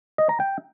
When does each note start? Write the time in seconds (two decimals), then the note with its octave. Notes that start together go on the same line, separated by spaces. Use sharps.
0.18 D#5
0.29 A#5
0.40 G5